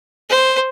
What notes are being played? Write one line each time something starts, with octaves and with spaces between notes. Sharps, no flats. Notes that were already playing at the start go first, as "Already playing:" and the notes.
C5